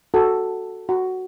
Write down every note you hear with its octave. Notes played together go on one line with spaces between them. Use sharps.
F#4 A4
F#4